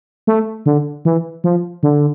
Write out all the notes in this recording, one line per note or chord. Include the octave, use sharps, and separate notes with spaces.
A3
D3
E3
F3
D3